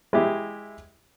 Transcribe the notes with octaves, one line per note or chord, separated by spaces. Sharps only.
G#3 E4 G4